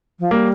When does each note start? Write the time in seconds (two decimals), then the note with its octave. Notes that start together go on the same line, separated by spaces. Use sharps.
0.19 F3
0.31 G3 A#3